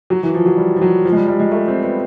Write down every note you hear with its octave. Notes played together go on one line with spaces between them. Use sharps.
F#3
E3
F3
F#3
G3
F3
F#3
F3
G#3
G3
G3
G#3
A3
C4
B3